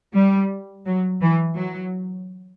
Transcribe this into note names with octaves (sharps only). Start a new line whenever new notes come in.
G3
F#3
E3
F#3